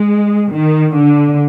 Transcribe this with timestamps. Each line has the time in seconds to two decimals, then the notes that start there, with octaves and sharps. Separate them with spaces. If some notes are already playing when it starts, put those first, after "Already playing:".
Already playing: G#3
0.52 D#3
0.95 D3